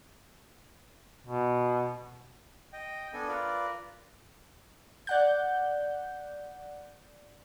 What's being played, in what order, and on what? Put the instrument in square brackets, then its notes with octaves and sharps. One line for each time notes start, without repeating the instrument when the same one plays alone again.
[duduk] B2
[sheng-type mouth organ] D#5 G5
B3 D4 A4 G#5
F4 A#4 B4 D5
[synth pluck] D5 F#5 G6